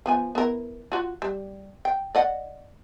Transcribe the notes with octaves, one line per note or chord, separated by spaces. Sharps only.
F3 B3 G#5
B3 E4 A#4
F4 F#4
G3
G5
D5 D#5 F#5